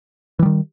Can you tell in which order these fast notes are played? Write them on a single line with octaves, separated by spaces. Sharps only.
E3 G3 D#3